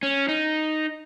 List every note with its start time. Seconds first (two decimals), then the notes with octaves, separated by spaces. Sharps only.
0.03 C#4
0.28 D#4